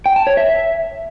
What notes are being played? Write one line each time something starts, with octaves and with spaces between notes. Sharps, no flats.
G5
A5
C#5
E5